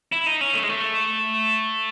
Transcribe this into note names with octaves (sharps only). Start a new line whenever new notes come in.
E4
D#4
C#4
A3
G#3
A3